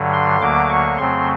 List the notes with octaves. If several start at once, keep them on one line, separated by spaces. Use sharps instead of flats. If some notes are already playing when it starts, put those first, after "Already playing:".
Already playing: G2 D3 F#3
C6
D2 D3 F#3 A#3 D6
C#6
F2 C#3 F#3 A3 C4 C6